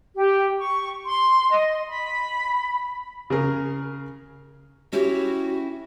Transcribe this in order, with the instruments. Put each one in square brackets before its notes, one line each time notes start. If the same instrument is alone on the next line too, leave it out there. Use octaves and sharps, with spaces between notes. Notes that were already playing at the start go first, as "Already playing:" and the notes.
[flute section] G4
C#6
C6
D#5
B5
[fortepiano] C#3 G#4 A#4
[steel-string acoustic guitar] C#4 E4 G4 [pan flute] F#4